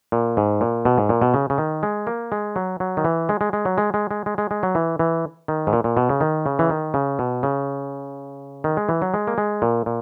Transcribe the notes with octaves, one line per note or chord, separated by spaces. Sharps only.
A#2
G#2
A#2
B2
G#2
A#2
B2
C#3
C#3
D#3
G#3
A#3
G#3
F#3
F#3
D#3
E3
G#3
G#3
G#3
F#3
G#3
G#3
G#3
G#3
G#3
G#3
F#3
E3
E3
D#3
G#2
A#2
A#2
B2
C#3
D#3
C#3
E3
D#3
C#3
B2
C#3
D#3
G#3
E3
F#3
G#3
A#3
G#3
A#2
A#2